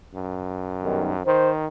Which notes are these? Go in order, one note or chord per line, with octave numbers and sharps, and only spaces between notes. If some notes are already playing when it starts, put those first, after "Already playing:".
F#2
B1 G2 D#3
D#3 C5